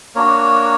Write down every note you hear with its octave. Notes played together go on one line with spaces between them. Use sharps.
A#3 D4 F#4 A#4 C#5